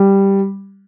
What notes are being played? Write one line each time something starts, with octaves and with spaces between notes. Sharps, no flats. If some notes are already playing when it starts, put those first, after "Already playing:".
Already playing: G3